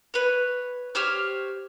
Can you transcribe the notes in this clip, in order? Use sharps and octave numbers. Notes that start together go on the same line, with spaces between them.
B4 C#5
G4 C5 C#5 F6